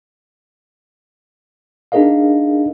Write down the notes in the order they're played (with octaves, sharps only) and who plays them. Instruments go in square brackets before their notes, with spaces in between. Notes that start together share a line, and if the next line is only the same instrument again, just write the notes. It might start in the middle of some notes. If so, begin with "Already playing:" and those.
[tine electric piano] D4 D#4 G#4 A#4 D#5 F5